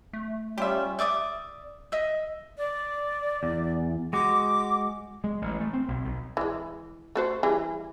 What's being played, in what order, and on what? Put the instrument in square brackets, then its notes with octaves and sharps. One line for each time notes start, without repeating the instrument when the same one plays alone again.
[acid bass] A3
[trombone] G3 [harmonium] C#4 F4 [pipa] G4 E5
[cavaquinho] D5 E5 D6 D#6
D#5 E5
[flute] D5
[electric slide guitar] E2
[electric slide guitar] G#3 F#4 [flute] D6
[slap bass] G#3
A1
A3
C4
B1
B1
[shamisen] E3 G#3
A3 F#4 C5
E3 G3 G#4